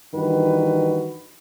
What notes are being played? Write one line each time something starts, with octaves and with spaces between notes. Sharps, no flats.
G2 D#3 E3 F#4 B4